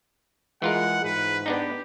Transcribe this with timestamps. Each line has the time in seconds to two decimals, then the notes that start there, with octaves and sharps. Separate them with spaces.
0.62 E3 G#3 F4 A#4 F#5
1.05 G#2 B4
1.46 B3 D4 D#4 G4